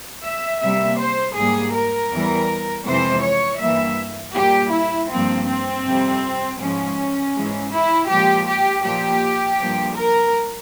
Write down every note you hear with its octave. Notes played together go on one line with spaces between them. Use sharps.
E5
C3 G3 A#3 E5
C5
G#2 G3 A#3 G#4
A#4
E2 E3 G3
F2 C3 E3 G#3 C5
C#5
G2 E3 G3 A#3 E5
A#2 G3 A#3 G4
E4
G2 F3 A#3 C4
C4
F2 C3 G3
G#2 F3 G#3 C#4
G#2 E3 G#3
E4
A#2 F3 G#3 G4
G4
A#2 F3 A#3 G4
G2 F3 A#3
A#4